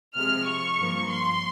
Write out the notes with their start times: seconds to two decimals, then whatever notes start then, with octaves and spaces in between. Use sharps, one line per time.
0.16 C3 F3 G#3 F6
0.47 C#6
0.78 G2 F3 A#3
1.09 C6